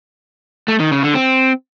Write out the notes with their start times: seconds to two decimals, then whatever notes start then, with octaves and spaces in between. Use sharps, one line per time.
0.68 A3
0.80 D#3
0.91 C#3
1.03 D3
1.15 C4